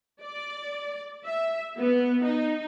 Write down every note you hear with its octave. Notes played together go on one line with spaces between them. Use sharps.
D5
E5
B3
D#4